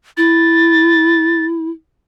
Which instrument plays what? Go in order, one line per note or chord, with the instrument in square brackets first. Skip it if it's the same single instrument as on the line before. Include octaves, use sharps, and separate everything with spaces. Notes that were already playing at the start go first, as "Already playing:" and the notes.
[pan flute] E4 [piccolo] A6